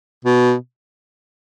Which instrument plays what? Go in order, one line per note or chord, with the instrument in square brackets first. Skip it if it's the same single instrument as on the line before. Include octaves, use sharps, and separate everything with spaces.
[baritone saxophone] B2